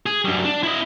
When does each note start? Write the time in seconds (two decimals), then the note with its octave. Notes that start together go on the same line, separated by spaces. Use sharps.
0.06 G#4
0.25 F#2 G3
0.44 D4
0.63 E4 D#5